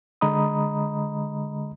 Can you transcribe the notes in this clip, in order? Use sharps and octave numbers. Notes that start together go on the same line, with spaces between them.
D3 G#3 D#5 A#5 B5 D#6